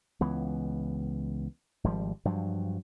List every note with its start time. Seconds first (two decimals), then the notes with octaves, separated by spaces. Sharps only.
0.21 C#2 E3 B3
1.84 G#1 F3 G3
2.25 G2 F3 F#3